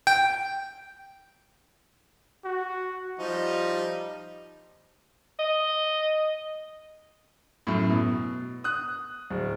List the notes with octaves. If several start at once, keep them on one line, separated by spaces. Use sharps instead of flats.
G5
F#4
F3 G3 D#4
D#5
F#2 A2
B2
D#6 F#6
D1